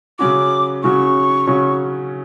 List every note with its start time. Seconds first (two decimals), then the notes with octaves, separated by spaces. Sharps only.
0.19 C#3 F#3 C#4 F#4 D6
0.83 C#3 F#3 C#4 F#4 C#6
1.47 C#3 F#3 C#4 F#4